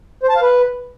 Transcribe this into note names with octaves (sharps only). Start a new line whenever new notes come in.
C5
A5
F5
B4